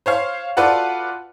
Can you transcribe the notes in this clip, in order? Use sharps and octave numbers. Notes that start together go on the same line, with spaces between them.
C5 C#5 F5
F4 F#4 A4 B4 D5 F#5